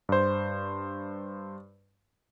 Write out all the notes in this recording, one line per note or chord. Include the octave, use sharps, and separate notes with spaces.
G2 C5